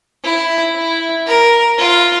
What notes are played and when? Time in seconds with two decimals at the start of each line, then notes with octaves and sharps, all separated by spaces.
0.24 E4
0.76 E4
1.27 A#4
1.79 F4